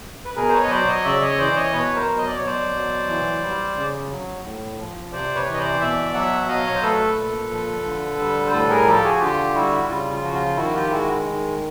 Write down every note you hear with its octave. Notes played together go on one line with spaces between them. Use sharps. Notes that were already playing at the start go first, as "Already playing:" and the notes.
B4
B2 G#4 A#4
C5
B4 C#5
D#5
F#3 C5 D5
C#5 D#5
C#3 D5 E5
C#5 D#5
E3 C5 D5
C#5 D#5
B2 B4 C#5
A#4 C5
F#3
D#5
D5
B2 C#5
C5 D5
F#3
E3
G3
C#3
F#3
A2
F3
C3 C5 D5
B4 C#5
E3
D#5
C5 D5
B2 D5 E5
F#3 E5 F#5
E5
F#3 D#5 F5
C#5
C5
A3 A4 B4
A#2
F3
D3
G3
C5
A2 A4 B4
G#4 A#4
F3 G4 A4
F#4 G#4
D3 F4 G4
G3 E4 F#4
C#3 F4
F4
F3 F#4
F4
D#3 E4 F#4
F4 G4
G#3 E4 F#4
D#3